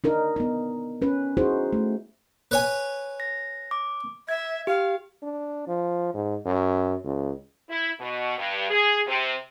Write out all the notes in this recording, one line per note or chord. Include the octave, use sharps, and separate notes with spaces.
D4 D#4 A#4
B3 D#4
C#4 B4
D#4 E4 F#4 G#4 C5
A3
B4 C#5 G#5
A#6
D6
E5 G#6
G4 F5
D4
F3
G#2
F#2
C#2
E4
B2
G2
G#4
C3